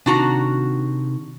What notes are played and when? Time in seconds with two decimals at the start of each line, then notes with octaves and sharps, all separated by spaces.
0.06 C3 D#3 D4 F#4 A#5